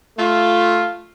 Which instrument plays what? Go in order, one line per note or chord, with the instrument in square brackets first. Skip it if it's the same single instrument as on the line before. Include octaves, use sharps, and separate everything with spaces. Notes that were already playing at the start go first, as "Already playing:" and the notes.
[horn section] A3 F4